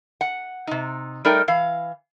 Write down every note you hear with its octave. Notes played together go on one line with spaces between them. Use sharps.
F#5
C3 D#4
G3 A3 D#4 A#4 D5 G5
E3 F5